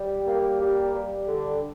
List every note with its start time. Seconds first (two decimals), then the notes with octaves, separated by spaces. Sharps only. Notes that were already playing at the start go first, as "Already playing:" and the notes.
Already playing: G3
0.27 A#3
0.60 G3
0.93 G3
1.28 D3